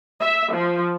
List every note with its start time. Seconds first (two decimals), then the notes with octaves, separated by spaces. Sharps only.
0.21 E5
0.54 F3